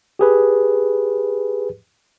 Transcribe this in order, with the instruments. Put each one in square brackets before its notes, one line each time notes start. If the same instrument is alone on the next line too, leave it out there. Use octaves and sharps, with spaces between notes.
[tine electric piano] G4 G#4 B4